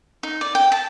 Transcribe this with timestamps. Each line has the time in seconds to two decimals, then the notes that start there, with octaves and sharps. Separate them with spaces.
0.23 D#4
0.41 D5
0.55 G5
0.72 A5